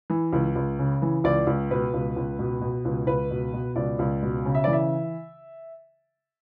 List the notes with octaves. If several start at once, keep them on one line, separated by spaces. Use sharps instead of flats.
E3
C#2
C#2
C#3
E3
C#2 D5
C#2
B2 B4
C#2
C#2
B2
B2
C#2
C#2 B4
B2
B2
C#2 D5
C#2
B2
C#3
E5
E3 D5
E5